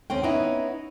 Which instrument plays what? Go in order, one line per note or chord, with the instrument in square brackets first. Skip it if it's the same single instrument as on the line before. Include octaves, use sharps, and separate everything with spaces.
[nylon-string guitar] D#2 C4 C#4 G5
B3 C#4 D#4 E4